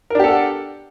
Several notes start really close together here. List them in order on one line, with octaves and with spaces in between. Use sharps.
A#4 D4 G4 A4 F#5